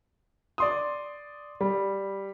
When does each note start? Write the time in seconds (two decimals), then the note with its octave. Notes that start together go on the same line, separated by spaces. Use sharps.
0.58 D5 C6 D#6
1.61 G3